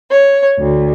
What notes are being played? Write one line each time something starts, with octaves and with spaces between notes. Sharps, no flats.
C#5
D2